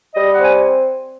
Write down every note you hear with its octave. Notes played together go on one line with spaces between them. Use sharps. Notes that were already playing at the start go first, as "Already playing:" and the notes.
G3 D#5
F#5
C4 G#5